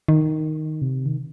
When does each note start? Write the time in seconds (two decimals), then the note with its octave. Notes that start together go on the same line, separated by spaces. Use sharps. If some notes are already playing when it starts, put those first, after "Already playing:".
0.08 D#3
0.82 C3
1.06 D#3